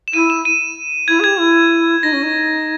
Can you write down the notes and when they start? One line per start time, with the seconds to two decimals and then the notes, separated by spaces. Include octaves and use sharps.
0.08 E7
0.13 E4 D#7
0.30 E7
0.45 D#7
1.08 E4 G#6
1.20 G#4
1.24 G4 G#6
1.39 E4
2.02 D#4 A#6
2.13 C#4
2.23 D#4